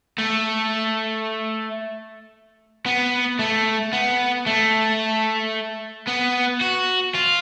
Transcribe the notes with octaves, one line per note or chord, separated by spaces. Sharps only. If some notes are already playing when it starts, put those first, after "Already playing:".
A3
B3
A3
B3
A3
B3
F#4
F4